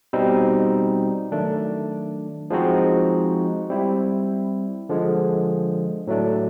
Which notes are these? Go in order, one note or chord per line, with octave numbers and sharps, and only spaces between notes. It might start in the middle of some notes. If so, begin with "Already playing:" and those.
B2 G3 C4 D#4
D#3 F#3 A3 D4
F3 G#3 C4 D#4 F#4
G3 C4 E4
D3 F3 G#3
A2 F#3 A3 D4